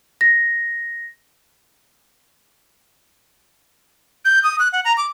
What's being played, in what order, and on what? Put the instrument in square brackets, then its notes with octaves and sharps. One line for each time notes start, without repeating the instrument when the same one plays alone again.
[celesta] A#6
[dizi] G6
D#6
F#6
F#5
A#5
D6